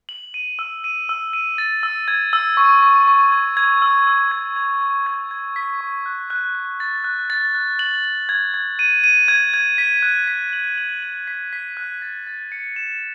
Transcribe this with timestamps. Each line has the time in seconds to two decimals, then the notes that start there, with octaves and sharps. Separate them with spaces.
0.09 F#7
0.34 D#7
0.59 E6
0.84 D#7
1.09 E6
1.33 D#7
1.58 A6
1.83 E6
2.08 G#6
2.33 E6
2.57 C#6
2.83 C#6
3.07 C#6
3.32 G#6
3.57 G#6
3.82 E6
4.07 E6
4.31 G#6
4.56 G#6
4.81 C#6
5.06 G#6
5.31 G#6
5.56 B6
5.81 C#6
6.06 F#6
6.30 F#6
6.55 F#6
6.80 A6
7.04 F#6
7.30 A6
7.55 F#6
7.79 F#7
8.04 F#7
8.29 G#6
8.54 G#6
8.79 D#7
9.04 D#7
9.28 G#6
9.54 G#6
9.78 B6
10.03 F#6
10.27 B6
10.53 F#7
10.78 F#7
11.03 F#7
11.27 B6
11.53 B6
11.77 F#6
12.02 A6
12.27 A6
12.52 C#7
12.76 E7